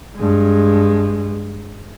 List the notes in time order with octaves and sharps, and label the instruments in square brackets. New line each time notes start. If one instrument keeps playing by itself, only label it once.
[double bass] G2 G#3